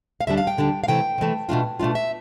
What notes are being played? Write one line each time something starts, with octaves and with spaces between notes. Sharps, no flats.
F5
D2 D3 G3 D4 E5
F5
G5
D2 D3 G3 D4
F5
C3 E3 A3 G5
C3 E3 A3
B2 A3 D4 F4
B2 A3 D4 F4
E5